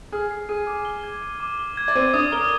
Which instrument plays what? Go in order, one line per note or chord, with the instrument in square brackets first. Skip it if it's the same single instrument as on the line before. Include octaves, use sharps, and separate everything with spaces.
[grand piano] G#4 [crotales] F6
[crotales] C7
[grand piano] G#4 [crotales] D#7
[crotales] D6
G7
G#6
D#7
D6
G7
G#6
[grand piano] D5
[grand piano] C4 C5 [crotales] D#7
[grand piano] D4 D5 [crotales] D#6
[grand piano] A#4 [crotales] G7